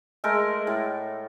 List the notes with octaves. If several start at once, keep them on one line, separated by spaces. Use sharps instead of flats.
G#3 A3 A#4
A2